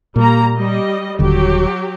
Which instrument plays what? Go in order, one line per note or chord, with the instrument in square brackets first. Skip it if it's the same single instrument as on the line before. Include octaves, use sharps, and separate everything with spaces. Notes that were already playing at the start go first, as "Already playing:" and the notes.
[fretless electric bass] A#2 [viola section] G3 A#3 A#5
[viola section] G3 D#5
[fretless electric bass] D#1 D3 [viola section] F#3 G4